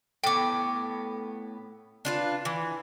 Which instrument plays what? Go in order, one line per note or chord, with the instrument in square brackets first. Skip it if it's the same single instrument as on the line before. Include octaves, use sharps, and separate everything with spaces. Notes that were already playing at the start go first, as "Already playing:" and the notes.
[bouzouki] A2 B3 [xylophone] G5 D6
[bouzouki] D4 F4 B4
E3